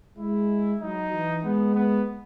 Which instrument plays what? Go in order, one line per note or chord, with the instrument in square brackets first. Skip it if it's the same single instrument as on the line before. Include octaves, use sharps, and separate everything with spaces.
[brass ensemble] G#3 [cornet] E4
[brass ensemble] F#3 [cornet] D#4
[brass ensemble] E3
[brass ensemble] G#3 [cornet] B3
[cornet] B3